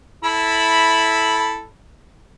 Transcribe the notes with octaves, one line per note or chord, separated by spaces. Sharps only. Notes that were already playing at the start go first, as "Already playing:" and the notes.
E4 A4 B5